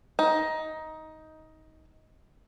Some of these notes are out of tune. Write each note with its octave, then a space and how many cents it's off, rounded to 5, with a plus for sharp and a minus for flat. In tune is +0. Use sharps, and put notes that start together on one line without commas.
D#4 +15